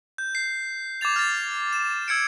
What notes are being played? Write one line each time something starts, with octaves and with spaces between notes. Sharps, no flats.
G6
C7
D6 G#6 A6 F7
F6 A6
E7
E6 G#6 C#7 D7